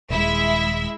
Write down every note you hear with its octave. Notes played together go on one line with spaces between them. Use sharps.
D#1 G#3 E4 E5